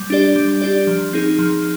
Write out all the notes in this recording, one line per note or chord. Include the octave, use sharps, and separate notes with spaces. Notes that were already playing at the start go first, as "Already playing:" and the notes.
Already playing: G3
D4 G4 D5
G3
D4 G4 D5
F3
C4 D#4 G#4
F3